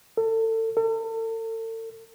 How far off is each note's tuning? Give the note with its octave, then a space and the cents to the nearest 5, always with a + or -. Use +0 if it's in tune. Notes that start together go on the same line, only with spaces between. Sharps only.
A4 +30
A4 +40